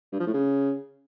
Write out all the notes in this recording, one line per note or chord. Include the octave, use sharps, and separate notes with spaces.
G2
F3
A2
C#3